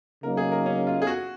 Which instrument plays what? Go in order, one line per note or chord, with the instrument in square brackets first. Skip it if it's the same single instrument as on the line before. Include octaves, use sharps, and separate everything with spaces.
[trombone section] C#3 F#3 A#3 D#4 [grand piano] A#4
[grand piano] G#4
A#4
C#4
F4
G#4
F#4